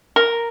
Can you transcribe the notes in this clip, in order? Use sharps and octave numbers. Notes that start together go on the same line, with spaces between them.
A#4